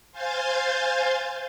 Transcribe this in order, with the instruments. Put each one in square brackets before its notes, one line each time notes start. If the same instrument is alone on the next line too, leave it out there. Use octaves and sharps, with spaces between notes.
[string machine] C5 F5 G#5 G6 A6